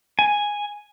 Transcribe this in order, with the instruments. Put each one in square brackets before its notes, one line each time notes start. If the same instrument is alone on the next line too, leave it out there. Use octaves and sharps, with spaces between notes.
[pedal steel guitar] G#5